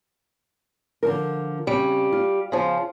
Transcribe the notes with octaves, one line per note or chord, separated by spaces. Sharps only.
D3 F3 A#4
C#3 G3 C4
F4
C#3 F3